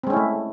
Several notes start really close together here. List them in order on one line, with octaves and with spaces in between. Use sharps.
C4 G#3 C#4 E4 A3